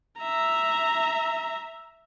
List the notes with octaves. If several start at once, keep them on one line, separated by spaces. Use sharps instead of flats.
E5 A#5